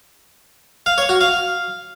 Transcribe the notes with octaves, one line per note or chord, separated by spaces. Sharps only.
F5
C#5
F#4
F5